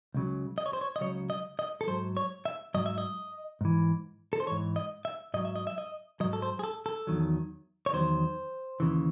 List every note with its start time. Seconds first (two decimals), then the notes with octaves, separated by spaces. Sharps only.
0.14 C#2 C#3 F#3
0.58 D#5
0.66 C#5
0.73 C5
0.81 C#5
0.96 D#5
1.01 C#2 C#3 F#3 C#5
1.30 D#5
1.59 D#5
1.81 A4
1.87 G#2 F#3 C5
2.17 C#5
2.45 E5
2.74 G#2 F#3 D#5
2.86 E5
2.98 D#5
3.61 G#2 E3
4.33 A4
4.40 C5
4.47 G#2 E3 C#5
4.76 D#5
5.05 E5
5.34 G#2 F#3 D#5
5.45 E5
5.56 D#5
5.67 E5
5.78 D#5
6.20 F#3 D#5
6.24 G#2
6.33 A4
6.42 C5
6.59 G#4
6.64 A4
6.86 A4
7.07 E2 D#3 F#3
7.86 C#5
7.93 E2 D#3 F#3 C5
8.80 D#2 C#3 E3